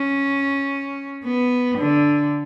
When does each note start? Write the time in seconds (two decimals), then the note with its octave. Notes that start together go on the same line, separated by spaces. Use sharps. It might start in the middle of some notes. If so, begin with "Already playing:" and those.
Already playing: C#4
1.25 B3
1.78 D3